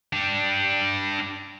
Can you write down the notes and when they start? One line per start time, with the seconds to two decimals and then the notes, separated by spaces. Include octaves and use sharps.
0.13 D4 G4